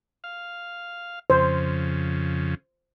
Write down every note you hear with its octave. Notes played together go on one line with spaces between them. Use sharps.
F5
F2 C#3 C5